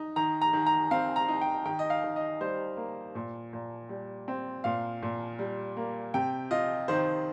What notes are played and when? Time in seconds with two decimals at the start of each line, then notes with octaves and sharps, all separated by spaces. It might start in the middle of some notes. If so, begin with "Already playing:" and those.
Already playing: D#4
0.16 D#3 A#5
0.41 A#5
0.53 D#3
0.66 A#5
0.91 C4 F5
1.16 A#5
1.28 D#4
1.41 G5
1.65 D#3 G5
1.79 D#5
1.90 F5
2.04 D#3
2.16 D#5
2.40 G3 C5
2.77 A#3
3.15 A#2
3.53 A#2
3.89 G3
4.28 C4
4.64 A#2 F5
5.03 A#2
5.39 G3
5.77 A#3
6.14 C3 G5
6.51 F4 D#5
6.88 D#3 C5